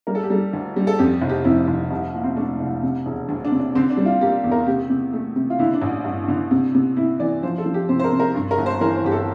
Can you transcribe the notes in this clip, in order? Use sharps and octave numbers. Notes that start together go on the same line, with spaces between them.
G3 A#4
A4
G4
G3 A4
D2
G3
A4
F2 G4
F1
G4
F2 E4
F1
C2
A#2
C4
A3 D4
C2
C3
E1
D2
D4
C3
D4
D3 C4
D4
G3
F4
A#3 G4
E2
A#4
C3 G4
C3
A3
C3
F4
D3 E4
D4
A1
G2
D3
C3
C3
C3 E4
E3 D5
F3 C5
A4
F3
G4
C3 C5
C5
A#4
C3
A#4
G2
A#4
G1
C5
E3 A#4
C5
G1 G4
A4